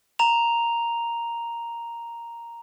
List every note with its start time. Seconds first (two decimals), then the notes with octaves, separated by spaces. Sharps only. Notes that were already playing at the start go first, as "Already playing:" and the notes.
0.19 A#5 F7